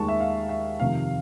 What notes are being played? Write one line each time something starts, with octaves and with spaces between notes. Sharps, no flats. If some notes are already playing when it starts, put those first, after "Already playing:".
Already playing: D#2 D#3 G#3 A5 C#6
E5
F5
E5
F2 C3 D#3 F5